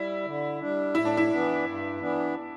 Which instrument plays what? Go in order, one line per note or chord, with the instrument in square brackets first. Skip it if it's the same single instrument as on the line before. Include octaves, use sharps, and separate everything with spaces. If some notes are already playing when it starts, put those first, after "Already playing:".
Already playing: [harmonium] G3 [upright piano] E4
[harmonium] D3
G3 D4
[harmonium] A2 [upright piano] E4
[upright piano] D4
E4
[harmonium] E3 B3 D4
G2
E3 B3 D4